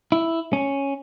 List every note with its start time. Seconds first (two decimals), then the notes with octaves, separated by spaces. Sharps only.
0.12 E4
0.53 C#4